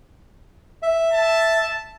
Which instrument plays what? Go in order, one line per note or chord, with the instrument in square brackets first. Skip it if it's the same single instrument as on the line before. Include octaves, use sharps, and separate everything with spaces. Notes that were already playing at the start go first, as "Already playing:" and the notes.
[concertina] E5
[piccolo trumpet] A5